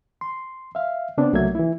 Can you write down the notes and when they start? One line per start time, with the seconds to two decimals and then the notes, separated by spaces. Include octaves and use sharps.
0.21 C6
0.75 E5 F5
1.18 C#3 B3 C4 D4
1.33 C2 F#3 A3 A#3 E5 G#6
1.55 E3 E4